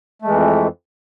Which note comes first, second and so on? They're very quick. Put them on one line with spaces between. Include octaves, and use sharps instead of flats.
A3 G#3 E3 F2